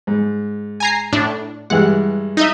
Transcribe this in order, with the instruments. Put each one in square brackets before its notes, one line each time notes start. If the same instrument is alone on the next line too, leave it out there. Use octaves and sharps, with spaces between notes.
[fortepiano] G#2
[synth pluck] G#5 A#5 C7
A2 D4
[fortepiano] G2 E3 G#3 [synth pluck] F#5
[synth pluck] D#4 D#5 E5